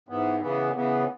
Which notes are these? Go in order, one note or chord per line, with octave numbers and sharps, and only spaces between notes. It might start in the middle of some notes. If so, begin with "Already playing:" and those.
G#2 E3 B3
C#3 E3 B3
C#3 E3 B3